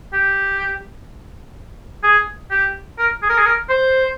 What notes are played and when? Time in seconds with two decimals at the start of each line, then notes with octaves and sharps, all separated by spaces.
0.13 G4
2.03 G#4
2.51 G4
2.98 A#4
3.22 G#4
3.30 A#4
3.38 G#4
3.46 A#4
3.69 C5